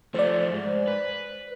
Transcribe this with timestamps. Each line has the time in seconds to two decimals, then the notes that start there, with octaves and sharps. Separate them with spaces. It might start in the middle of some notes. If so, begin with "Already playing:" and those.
0.14 F3 A3 C5 D5
0.52 G#2
0.88 B4